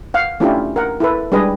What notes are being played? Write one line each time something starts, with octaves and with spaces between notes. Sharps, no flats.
F5 F#5
A3 C#4 D4 E4 F4 G4
A#4 F#5
E4 A4 B4
G3 G#3 D4 G#4 B4 D#5